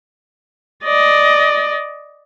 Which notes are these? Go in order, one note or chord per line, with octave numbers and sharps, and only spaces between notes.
D5 D#5